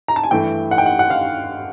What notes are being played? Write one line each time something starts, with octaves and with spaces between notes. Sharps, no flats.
A#5
A5
G#5
G2 E3 A3 G5
F#5
G5
F#5
F#5
F5